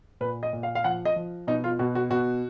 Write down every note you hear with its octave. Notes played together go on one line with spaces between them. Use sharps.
A#2 B4
D#5
A#2
F5
F5
F3 F#5
D#5
F3
B2 D#4
F4
B2 F#4
F#4
B2 F#4